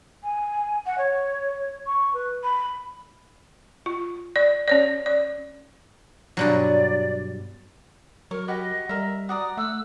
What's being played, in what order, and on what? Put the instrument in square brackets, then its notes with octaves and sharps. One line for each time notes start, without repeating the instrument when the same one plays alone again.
[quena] G#5
F#5
C#5
C#6
B4
B5
[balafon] F4
D5
C#4 C#5 D5
D5
[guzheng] G2 B2 F#3 [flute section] D5
[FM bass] F#3 [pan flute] A#4 [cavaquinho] C#5
[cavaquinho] F#4 G4 B5 [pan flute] D#5
[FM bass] G3 [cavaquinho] A#4 E5
[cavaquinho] F#4 D5 A#5 [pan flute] D#6
[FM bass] A3 [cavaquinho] F#5 [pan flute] E6